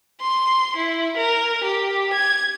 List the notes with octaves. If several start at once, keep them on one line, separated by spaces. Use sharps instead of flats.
C6
E4
A#4
G4
G#6